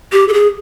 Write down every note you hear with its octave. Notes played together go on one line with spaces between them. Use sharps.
G4
A4
G#4